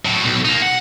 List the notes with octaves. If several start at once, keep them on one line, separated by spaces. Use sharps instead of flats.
A2 F#3
B1
A#3 D#4
F#5